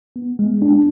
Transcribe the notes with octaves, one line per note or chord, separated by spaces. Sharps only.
B3
G#3
D4